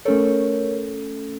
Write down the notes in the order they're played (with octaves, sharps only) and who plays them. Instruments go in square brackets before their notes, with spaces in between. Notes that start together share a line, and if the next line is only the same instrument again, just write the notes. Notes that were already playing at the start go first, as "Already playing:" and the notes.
[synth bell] A3 C#4 A4 [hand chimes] A#4 C#5